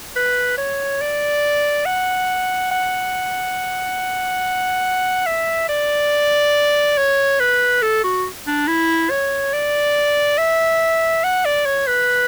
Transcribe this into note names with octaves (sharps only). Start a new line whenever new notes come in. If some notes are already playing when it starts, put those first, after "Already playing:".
B4
C#5
D5
F#5
F#5
E5
D5
C#5
B4
A4
F#4
D4
E4
C#5
D5
E5
F#5
D5
C#5
B4